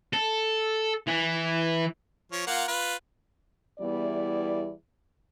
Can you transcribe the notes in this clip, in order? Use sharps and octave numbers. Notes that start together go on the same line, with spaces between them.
A4
E3
F3 C#5
A#3 F4 F#5
F4 B4
E2 G3 B3 E4 D5